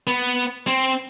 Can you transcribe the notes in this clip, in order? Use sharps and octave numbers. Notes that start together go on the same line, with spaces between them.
B3
C4